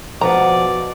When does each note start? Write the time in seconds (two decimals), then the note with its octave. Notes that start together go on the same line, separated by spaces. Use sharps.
0.21 B2 F3 B4 D5 F#5 A#5